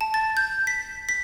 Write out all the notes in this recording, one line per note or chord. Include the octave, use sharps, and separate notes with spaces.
A5
A6
G6
B6
B6